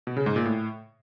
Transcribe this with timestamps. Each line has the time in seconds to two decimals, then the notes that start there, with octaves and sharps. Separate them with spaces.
0.07 B2
0.16 C#3
0.26 G#2
0.36 A#2
0.45 A2